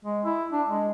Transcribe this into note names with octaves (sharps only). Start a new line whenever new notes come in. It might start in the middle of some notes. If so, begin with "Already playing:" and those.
G#3
E4
D4
G#3